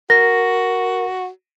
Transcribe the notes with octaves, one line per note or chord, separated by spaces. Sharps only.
F#4 A#4 A#6